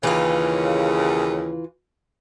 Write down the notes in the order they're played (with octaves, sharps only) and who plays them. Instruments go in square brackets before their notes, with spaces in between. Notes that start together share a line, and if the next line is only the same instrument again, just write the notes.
[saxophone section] D#2 C#3 [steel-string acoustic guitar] E3 F4